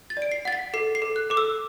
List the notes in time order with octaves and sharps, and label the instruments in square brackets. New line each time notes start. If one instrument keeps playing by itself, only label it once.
[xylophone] A6
D5
D7
C7
F#5 A6
B6
A4 C7
C7
A4
F#6
A4 D6
E6